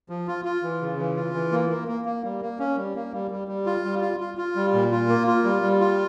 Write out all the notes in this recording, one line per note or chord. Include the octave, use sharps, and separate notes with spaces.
F3
F4
F4
E3
C#3
E3
F4
E3
A#3
A#3
A#3
A#3
G3
A#3
C#4
G3
A#3
G3
G3
G3
F4
G3
F4
F4
F4
G3
A#2
F4
A#3
F4
G3
G3
F4